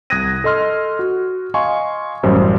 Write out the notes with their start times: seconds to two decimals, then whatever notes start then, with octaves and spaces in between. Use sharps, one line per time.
0.10 C2 D#6 F#6 G#6 A#6 D#7
0.44 A4 D#5 C6 F6
0.99 F#4
1.54 D#5 F5 G#5 C6 C#6
2.23 A1 F#2 G3 C5